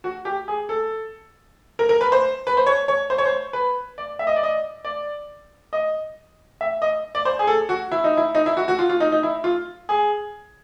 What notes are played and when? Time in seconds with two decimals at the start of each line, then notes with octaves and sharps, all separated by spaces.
0.04 F#4
0.25 G4
0.48 G#4
0.69 A4
1.79 A#4
1.89 A#4
2.01 B4
2.12 C5
2.47 B4
2.57 C5
2.66 C#5
2.88 C#5
3.10 C5
3.18 C#5
3.26 C5
3.53 B4
3.98 D5
4.19 E5
4.27 D#5
4.36 D5
4.43 D#5
4.85 D5
5.73 D#5
6.61 E5
6.82 D#5
7.15 D5
7.25 C5
7.39 G#4
7.47 A4
7.69 F#4
7.92 E4
8.04 D#4
8.17 E4
8.35 D#4
8.46 E4
8.57 F#4
8.68 F#4
8.79 F4
8.89 F4
9.00 D#4
9.12 D#4
9.23 E4
9.44 F4
9.89 G#4